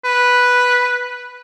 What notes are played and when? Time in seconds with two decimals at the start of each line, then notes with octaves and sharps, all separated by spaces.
0.04 B4